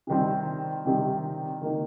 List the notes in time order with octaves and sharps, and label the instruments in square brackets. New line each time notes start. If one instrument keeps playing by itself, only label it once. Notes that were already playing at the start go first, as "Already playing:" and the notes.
[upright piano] C3 D#3 G3 C4
C3 D#3 G3 C4
D#3 A#3 D#4